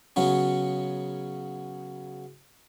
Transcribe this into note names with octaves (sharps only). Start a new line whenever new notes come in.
C#3 F#3 B3 C#4